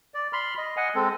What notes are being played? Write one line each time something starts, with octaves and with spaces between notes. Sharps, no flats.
D5
B5 C6 F6
D#5
D#5 F#5 G#5
G#3 C4 A4